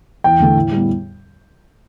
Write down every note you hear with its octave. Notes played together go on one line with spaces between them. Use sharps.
E2 G5
D3 A3
A2
G3 B3